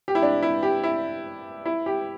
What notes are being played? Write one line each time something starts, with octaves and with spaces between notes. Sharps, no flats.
G4
E4
D4
E4
G4
E4
E4
G4